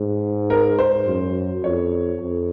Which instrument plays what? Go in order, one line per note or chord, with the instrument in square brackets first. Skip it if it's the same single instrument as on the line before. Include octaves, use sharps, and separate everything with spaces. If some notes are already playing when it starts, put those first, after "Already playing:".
Already playing: [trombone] G#2
[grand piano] A#4
C5
[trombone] F#2
[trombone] F2 [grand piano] C#5
[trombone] F2